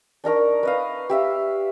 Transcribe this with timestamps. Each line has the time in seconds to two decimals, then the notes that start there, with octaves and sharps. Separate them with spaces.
0.24 D4 D#4 A#4 C#6
0.63 B4 D#5 F5
1.09 G4 E5 F5